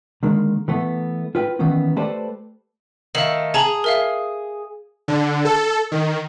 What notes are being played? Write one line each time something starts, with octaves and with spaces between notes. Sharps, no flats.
D3 D#3 G#3 A#3
E3 A3 B3
F4 B4 G5
D#3 E3 A#3 B3 C#4
A3 G4 A4 B4 C5 D5
D#3 A3 F5 F#7
G#4 A5 A#5 F#7
A#4 E5 F5
D3
A4
D#3